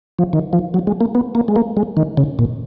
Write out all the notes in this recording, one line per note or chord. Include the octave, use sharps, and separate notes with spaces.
F3
D#3
F3
F#3
G#3
A#3
B3
A#3
G#3
A#3
G#3
D#3
C#3
A#2